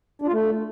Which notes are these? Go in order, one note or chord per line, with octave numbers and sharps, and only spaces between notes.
D4
F4
A3